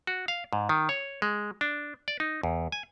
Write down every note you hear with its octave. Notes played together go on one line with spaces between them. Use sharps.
F#4
F5
G#2
D#3
C#5
G#3
D4
D5
D#4
E2
G#5